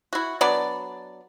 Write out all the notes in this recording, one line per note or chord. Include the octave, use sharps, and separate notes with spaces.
E4 F#4
F#3 B3 D4 D5